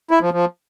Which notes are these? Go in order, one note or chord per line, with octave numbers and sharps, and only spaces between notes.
E4
F3
F3